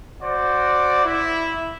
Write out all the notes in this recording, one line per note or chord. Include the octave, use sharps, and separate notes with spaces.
F#4 C5 D5
E4